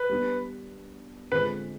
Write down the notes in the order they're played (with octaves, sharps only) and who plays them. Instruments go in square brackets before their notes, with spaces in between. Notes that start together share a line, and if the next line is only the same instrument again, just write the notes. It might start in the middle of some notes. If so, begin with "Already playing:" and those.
Already playing: [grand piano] B4
[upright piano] G3 B3 D4
[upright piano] D3 G#3 C4 F4 [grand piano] B4